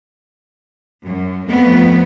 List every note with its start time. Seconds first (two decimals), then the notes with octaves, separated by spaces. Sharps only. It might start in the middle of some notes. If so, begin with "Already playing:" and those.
1.04 F#2
1.46 F2 A3 B3